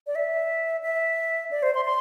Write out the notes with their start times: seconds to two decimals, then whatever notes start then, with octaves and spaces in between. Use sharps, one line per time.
0.07 D5
0.15 E5
0.83 E5
1.51 D5
1.63 C5
1.75 C6
1.85 C6